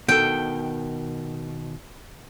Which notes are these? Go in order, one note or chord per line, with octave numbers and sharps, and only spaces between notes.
B2 D#3 A4 G5